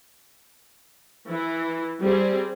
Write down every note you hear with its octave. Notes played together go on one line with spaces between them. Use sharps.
E3
G3 C4 G#4